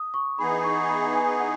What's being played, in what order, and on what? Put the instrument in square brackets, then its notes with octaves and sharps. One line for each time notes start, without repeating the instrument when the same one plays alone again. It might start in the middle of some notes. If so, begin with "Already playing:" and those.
Already playing: [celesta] D#6
C#6
[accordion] E3 B3 D#4 G#4 [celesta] B5
[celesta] C#6
B5
G#5
F#5